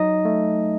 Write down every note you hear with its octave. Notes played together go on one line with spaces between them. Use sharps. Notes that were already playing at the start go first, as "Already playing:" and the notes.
Already playing: F#3 D#4 D#5
A3